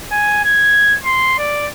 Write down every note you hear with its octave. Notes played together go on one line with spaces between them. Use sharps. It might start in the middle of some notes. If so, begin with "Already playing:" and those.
G#5
G#6
C6
D5